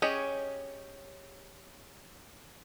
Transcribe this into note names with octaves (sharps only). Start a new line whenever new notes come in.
C#4 G4 G#4 C#5 D#5